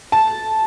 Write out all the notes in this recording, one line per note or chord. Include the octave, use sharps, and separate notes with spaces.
A5